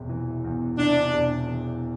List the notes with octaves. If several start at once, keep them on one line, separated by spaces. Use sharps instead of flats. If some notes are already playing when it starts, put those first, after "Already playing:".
Already playing: E1 C3
E3
E2
C3 D4
E1
E3